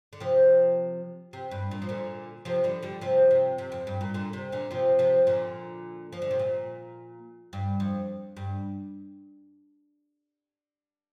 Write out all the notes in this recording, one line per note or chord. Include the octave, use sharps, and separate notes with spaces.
D3
C3 F3
C3
G2
A#2
F3
A#2 D3
C3 F3
D3 G3
D3 G3
C3 F3
C3
C3
F2
G2
A#2
A#2 D3
C3
A#2 D3
C3 F3
C3 F3
A#2 D3
F3
D3
C3
A#2
G2
F2
G2